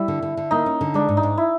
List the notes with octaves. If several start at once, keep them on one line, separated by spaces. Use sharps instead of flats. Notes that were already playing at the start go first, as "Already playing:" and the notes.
Already playing: G3 E4
D3
D3
D3
A#3 D#4
C#4
D3
G#3 D4
G#2
D#4
G#2
E4